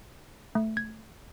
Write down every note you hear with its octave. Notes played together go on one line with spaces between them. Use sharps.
A3
G#6